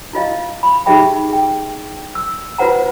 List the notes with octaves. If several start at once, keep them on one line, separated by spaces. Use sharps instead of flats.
E4 F4 D#5 F5
B5
D#4 G4 G#4 E5 G5 B5
G#4 G5
E6
F4 B4 C5 F#5 A#5